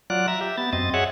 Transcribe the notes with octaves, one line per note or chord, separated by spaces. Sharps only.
F#3 F4 D5 F#6
E5 A#5
G4 E5
B3 A6
F#2 C4 D#5 A6
G#4 C#5 E5 F#5